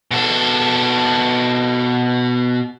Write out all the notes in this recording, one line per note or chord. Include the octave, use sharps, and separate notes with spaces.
B2 A4